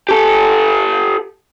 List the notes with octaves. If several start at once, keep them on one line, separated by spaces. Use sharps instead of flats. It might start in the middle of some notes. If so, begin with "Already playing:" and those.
G4 A4